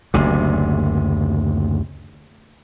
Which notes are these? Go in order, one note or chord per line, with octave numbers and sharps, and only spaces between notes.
F#1 D2 C3